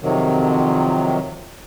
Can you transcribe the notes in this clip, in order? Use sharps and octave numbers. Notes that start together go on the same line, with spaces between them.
F2 C3 D#3 F#3